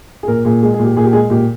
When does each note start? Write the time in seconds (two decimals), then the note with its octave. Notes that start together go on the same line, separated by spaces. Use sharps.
0.23 G#4
0.28 A#2 A#4
0.45 A#2 G#4
0.63 G#3 G#4
0.74 G#4
0.79 A#2
0.85 G4
0.97 A#2 G#4
1.05 G4
1.13 G#3 G#4
1.30 A#2 G4